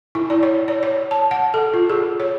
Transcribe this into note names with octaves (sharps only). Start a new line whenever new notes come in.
E4
D5
C#5
D5
C#5
A5
F#5
A4
F4
G#4
C#5